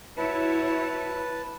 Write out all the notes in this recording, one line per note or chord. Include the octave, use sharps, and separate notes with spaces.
E4 F#4 B4 C#5 A5